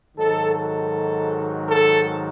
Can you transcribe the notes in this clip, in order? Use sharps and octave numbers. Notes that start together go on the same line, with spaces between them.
G#2 D#3 F#3 A4
A4
A4